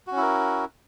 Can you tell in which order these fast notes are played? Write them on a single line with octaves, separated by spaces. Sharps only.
F#4 C#4 E4 A#4